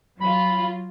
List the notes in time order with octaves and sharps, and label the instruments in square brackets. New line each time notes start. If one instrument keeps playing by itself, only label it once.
[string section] F#3 F4 [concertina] B5